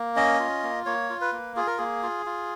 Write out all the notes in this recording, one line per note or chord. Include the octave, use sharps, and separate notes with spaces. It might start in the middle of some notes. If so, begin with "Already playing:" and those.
Already playing: A#3
C#4 D#5
F4
A#3
A#3 C#5
F4
B4
A#3
F4 G#4
A#4
A#3 G#4
F4
F4